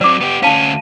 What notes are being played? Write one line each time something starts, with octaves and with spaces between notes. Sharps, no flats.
F#3 C4 D5 D6
B3 G4
D2 C#4 F5 A5